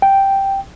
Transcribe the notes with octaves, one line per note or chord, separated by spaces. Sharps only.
G5